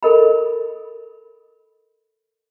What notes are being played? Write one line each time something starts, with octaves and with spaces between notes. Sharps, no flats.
A4 A#4 D#5 B5